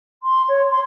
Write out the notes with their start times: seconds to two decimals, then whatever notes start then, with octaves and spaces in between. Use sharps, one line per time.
0.23 C6
0.48 C#5
0.71 C6